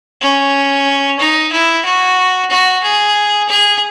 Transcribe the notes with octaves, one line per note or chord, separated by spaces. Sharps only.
C#4
D#4
E4
F#4
F#4
G#4
G#4